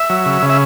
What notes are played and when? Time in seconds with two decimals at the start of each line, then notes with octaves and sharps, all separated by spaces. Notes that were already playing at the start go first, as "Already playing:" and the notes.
Already playing: E5
0.10 F#3
0.26 C#3
0.42 C#3
0.49 E5